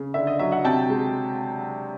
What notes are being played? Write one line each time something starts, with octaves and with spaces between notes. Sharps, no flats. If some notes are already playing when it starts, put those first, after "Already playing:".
Already playing: C#3
D3 E5
D#5
F#3 E5
E5 F#5
C3 G5 A5
G#3